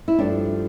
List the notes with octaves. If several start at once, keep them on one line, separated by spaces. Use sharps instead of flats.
E4
G2 F3 A3 D4